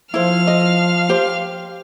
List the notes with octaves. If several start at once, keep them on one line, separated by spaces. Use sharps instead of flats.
F3 E4 C5 F5 F6
D#5
G4 C5